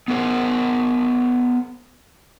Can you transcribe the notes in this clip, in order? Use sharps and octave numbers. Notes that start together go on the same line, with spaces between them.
B3 G#4 A#4 C5